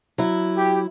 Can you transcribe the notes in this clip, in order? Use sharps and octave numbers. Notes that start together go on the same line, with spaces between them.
F#3 E4
G4